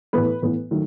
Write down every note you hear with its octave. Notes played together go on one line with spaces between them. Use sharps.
A2 E3 B3 B4
A2 E3 B3
D#3 F#3 A3